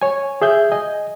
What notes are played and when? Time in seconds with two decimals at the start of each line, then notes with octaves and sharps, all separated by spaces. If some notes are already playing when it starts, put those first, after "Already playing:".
0.02 C#5 G#5
0.42 G#4 E5 G6
0.72 D#5 G#5